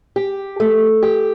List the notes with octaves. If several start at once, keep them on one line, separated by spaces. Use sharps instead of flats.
G4
A3
G4